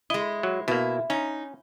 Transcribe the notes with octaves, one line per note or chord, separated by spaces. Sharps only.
G#3 E4 D#5
F#3
B2 A#3 E4
C#4 D#4